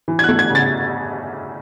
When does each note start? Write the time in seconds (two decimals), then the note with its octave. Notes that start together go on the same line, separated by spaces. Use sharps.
0.08 E3
0.19 G#6
0.24 A3 F#6
0.39 G#6
0.50 C#3 A6